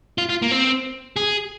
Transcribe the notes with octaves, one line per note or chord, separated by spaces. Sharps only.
F4
F4
A#3
C4
G#4